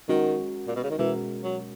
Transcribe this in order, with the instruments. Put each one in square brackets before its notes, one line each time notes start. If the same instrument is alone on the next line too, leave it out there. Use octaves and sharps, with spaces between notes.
[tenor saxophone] D#3 [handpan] G#3 C#4 F#4 A#4
[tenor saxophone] A#2
B2
C#3
D#3
[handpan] B2 G#3 C#4 F#4 A#4 [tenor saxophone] E3
[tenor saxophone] F#3